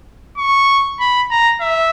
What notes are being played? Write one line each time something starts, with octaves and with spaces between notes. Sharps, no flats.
C#6
B5
A#5
E5